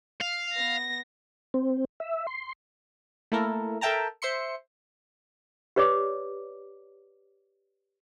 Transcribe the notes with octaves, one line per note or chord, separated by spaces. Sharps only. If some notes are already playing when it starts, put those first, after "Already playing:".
F5
B3 A#6
C4
E5
C6
A3 A#3 E4 A4 A#4
A4 A#4 E5 G5 A5 A#5
C5 E5 C6 C#7
G4 B4 C#5 D5 D6